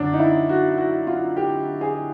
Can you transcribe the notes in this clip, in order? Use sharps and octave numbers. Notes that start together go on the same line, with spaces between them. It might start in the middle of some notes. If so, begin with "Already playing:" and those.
Already playing: F#2 D3 C#4 D4
D#4
E4
F#4
F#4
F4
G4
G#4